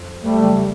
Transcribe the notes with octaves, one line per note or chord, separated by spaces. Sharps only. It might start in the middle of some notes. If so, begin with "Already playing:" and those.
Already playing: F2
G3 A3
C#3 F#3 A#3